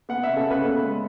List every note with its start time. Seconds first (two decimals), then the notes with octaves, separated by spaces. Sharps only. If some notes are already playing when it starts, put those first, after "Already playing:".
0.09 B3 F#5
0.23 C#3 E5
0.37 A4
0.46 C#3 B4
0.64 B3
0.82 G#3